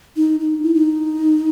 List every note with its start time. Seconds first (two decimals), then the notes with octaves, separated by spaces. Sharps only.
0.17 D#4
0.40 D#4
0.63 E4
0.74 D#4